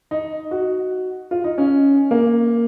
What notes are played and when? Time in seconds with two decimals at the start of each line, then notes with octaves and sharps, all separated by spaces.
0.11 D#4
0.51 F#4
1.31 F4
1.44 D#4
1.58 C#4
2.11 A#3